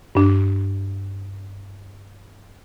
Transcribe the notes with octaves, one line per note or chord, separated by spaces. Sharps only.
G2 D4